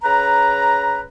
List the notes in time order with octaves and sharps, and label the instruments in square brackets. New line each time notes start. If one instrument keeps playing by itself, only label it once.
[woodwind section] C#3 B4 A#5